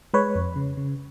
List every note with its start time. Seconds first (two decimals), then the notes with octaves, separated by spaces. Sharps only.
0.14 G#3 B4 C#5
0.35 F2
0.56 C#3
0.77 C#3